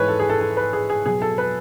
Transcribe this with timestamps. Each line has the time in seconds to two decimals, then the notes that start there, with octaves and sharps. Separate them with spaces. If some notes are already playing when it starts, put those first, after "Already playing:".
Already playing: G#2 E3 G#3 B4 C#5
0.08 A4
0.19 G#4
0.30 A4
0.41 A4
0.57 B4
0.73 G#4
0.90 G#4
1.05 B2 F#3 G#4
1.22 A4
1.38 B4